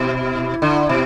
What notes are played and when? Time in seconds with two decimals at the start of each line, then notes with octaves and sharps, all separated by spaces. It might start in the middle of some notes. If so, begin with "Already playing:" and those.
Already playing: B2 E4
0.62 D3
0.89 B2